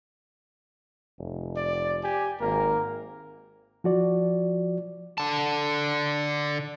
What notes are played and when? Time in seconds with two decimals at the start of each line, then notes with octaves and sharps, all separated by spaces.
1.19 F1
1.56 D5
2.04 G4 G#5
2.41 G#1 A#3 A#4
3.84 F3 F#4 D5
5.18 D3 A5